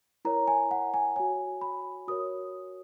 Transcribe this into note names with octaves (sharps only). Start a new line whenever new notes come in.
E4 A#4 C#5 A#5
G#5
F#5
G#5
F#4 C#5 G#5
B5
F#4 A#4 C#5 D#6